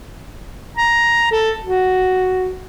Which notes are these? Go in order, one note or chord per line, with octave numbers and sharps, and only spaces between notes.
A#5
A4
F#4